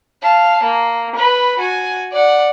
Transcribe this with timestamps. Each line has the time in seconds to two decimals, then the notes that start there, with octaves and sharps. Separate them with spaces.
0.23 F5 A5
0.63 A#3
1.16 B4 B5
1.59 F#4 G#5
2.12 D5 F#5